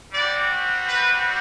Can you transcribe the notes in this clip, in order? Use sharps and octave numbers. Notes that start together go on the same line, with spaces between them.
G3 C4 F#4 D5
B4